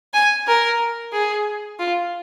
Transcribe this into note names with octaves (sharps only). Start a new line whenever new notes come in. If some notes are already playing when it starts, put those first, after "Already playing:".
G#5
A#4
G#4
F4